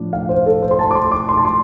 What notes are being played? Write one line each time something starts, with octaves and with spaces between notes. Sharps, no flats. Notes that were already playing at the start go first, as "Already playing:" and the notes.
Already playing: A2 F3 D4
F5
C5
A4
C5
C6
A5
D6
C6
D6
C6
A5
C6